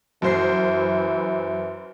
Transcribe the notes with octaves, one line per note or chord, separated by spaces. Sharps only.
F#2 E3 C5 C7